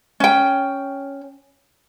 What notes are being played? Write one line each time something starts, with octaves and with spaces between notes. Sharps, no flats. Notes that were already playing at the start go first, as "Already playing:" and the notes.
C#4 G5